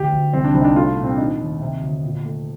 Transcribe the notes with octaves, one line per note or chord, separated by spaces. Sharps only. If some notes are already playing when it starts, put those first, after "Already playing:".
Already playing: D2 G4
D2
C2 C4
D4
C2 C4
D#4
D4
A3 F4
A#2
C4
D4
D#3 D#4
D#2
C3
D2
A#2
A3